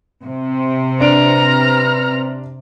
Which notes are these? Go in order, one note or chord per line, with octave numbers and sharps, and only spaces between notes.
C3
D4 B4 A#5 F6 D7